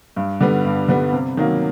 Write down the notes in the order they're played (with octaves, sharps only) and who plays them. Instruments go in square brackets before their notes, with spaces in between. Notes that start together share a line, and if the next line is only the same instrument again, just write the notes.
[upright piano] G2
D3 G3 B3
G2
D3 G3 B3
C3
D#3 F#3 A#3